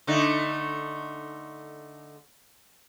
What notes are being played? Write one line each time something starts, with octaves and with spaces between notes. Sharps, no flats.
D3 A3 D#4